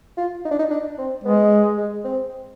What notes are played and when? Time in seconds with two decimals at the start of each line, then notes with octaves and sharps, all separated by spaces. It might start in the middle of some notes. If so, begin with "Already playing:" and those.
0.17 F4
0.45 D#4
0.51 D4
0.59 D#4
0.71 D4
0.98 C4
1.24 G#3 B3
1.78 G#3
2.04 C4